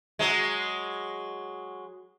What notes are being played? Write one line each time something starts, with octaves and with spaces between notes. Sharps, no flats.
F#3 G#3